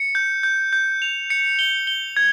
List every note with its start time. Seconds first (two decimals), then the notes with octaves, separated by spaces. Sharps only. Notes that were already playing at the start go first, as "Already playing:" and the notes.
Already playing: C#7
0.15 G6
0.43 G6
0.73 G6
1.02 F7
1.30 C#7
1.59 G7
1.87 G7
2.17 G#6